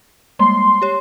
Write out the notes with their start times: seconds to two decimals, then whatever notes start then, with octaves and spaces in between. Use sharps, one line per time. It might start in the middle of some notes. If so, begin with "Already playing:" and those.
0.39 G3 G#3 A#3 C6
0.82 G4 C#5